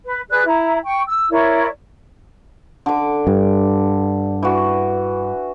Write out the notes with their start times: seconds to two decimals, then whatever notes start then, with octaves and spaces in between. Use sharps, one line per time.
0.05 B4
0.29 G#4 B4 D5 F#6
0.45 E4 A#5
0.84 G5 C#6
1.06 E6
1.30 E4 A#4 C#5 D5
2.86 D3 D6
3.27 G2
4.43 E3 F#4